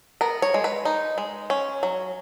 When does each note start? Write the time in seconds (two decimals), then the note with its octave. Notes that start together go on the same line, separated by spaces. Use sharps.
0.21 B3 A#4
0.42 C#5
0.54 G#3
0.64 B4
0.85 D#4
1.18 G#3
1.50 C#4
1.83 F#3